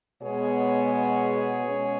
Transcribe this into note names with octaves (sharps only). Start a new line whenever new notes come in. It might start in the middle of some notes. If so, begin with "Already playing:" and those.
B2 G#3 B3 G#4 C#5
B2 G#3 C#4